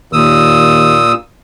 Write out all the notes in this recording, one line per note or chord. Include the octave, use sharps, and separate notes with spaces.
D#2 A#2 D#6 E6